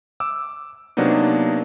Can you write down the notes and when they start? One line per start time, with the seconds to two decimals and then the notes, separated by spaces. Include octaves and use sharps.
0.20 D6 E6
0.97 C3 F#3 A#3 B3 D4 D#4